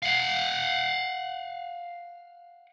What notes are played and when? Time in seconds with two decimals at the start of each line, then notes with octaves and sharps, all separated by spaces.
0.02 F5 F#5